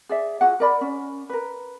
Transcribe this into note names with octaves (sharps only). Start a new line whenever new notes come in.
G#4 D5 E5
F4 F#4 G#4 F#5
A#4 D5 B5
C#4
A#4 B4